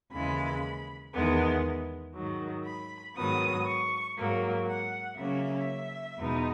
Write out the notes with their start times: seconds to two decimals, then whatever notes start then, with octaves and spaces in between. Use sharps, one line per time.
0.12 D#2 C#3 E3 G#3 B5
1.13 E2 D#3 G#3 B3
2.15 G#2 D#3 F#3
2.65 B5
3.15 G#2 D#3 F#3 B3 D#6
3.66 C#6
4.17 G#2 F#3 A#3
4.67 F#5
5.17 C#3 F#3 A#3 C#4 E5
6.19 E2 B2 G#3 B3 D#4